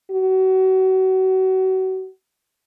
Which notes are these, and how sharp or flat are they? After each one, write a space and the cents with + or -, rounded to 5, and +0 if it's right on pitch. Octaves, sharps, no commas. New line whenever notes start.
F#4 +30